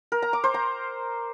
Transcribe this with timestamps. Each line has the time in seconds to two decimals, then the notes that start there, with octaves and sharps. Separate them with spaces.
0.12 A#4
0.22 A#5
0.33 D6
0.44 C5
0.54 A#5